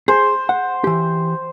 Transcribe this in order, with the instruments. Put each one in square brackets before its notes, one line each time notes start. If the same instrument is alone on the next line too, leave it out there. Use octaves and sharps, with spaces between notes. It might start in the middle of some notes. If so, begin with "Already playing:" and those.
[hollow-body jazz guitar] G#4 [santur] C5
[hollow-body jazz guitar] F#5
E3 G4